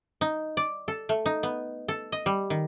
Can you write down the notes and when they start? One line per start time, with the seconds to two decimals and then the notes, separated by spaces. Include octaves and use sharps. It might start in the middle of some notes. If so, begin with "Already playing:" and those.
0.21 D#4
0.57 D5
0.88 A4
1.09 A3
1.26 D#4
1.43 B3
1.88 A4
2.12 D#5
2.26 G3
2.50 D#3